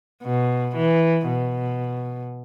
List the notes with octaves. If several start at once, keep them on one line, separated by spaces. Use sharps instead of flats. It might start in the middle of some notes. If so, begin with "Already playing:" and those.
B2
E3
B2